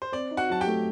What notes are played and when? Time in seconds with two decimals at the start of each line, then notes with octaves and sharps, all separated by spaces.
0.02 C5
0.12 C4 D5
0.31 D#4
0.37 F#4 F#5
0.50 F#3 A5
0.61 G4 G5
0.67 A3